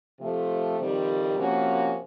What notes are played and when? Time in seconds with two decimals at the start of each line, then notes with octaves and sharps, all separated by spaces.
0.19 C3 F3 A3
0.78 F2 C3 D#3 G3
1.36 C3 F3 A#3 C#4 F#4